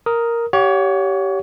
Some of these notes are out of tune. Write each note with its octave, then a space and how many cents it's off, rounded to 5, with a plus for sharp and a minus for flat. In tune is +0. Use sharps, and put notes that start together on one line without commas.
A#4 +0 D#6 +10
G4 -15 C#5 +20 F#5 -40